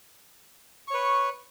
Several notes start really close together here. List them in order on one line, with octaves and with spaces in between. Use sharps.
C#6 C#5 B4